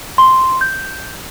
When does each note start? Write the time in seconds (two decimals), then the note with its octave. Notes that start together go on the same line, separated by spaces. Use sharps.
0.18 C6
0.61 G6